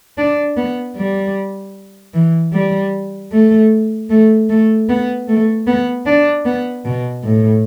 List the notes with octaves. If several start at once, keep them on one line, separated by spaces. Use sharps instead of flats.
D4
B3
G3
E3
G3
A3
A3
A3
B3
A3
B3
D4
B3
B2
A2